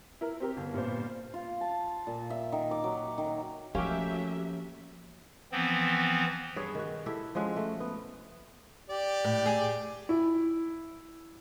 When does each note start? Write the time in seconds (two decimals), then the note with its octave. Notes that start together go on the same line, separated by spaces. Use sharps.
0.21 E4 A#4
0.40 C4 G4 A#4
0.57 G1
0.74 G2 A#2 B3 C5
1.34 F4
1.61 A5
2.07 A#2
2.30 E5
2.52 D#3
2.71 D6
2.84 F#3
3.18 D#3
3.75 F3 F#3 A3 A#3 C#4 G4 E5 G5
5.52 E3 F3 B3 C4
6.56 G2 G#4 B4 C#5
6.75 D#3 F#4
7.06 E4 G4 A4 E5
7.35 F3 G#3 C#4 F#4
7.56 A3
7.80 B3
8.89 G4 D5
9.25 A2
9.46 G#4
10.09 E4